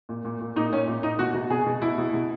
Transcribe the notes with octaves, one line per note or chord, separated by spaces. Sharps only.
A#2
A#2
A#2
A#2 D#4
A#2 C#4
A#2
A#2 D#4
B2 F#4
B2
B2 G#4
B2
B2 E4
B2
B2